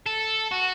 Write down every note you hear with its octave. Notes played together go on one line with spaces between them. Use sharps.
A4
F#4